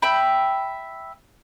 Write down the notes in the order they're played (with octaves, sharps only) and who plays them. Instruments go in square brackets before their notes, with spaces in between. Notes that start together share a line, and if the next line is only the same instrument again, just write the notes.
[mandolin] E5 G5 B5